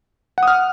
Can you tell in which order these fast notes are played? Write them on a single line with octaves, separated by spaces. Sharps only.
F#5 D#6 F6